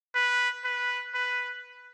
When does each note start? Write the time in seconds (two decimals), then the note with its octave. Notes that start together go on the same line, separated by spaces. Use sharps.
0.15 B4
0.65 B4
1.14 B4